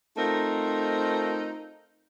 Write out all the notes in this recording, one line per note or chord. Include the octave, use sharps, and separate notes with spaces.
A3 C4 D#4 F4 A#4